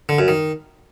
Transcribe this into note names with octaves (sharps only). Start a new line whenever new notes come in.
D3
F#2
D#3